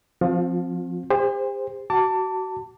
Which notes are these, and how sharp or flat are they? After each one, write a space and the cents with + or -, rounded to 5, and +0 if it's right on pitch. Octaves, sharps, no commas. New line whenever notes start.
F3 +0 C4 +0 F4 +40
G4 +45 C5 +0
F#4 +25 A5 +20 D6 -20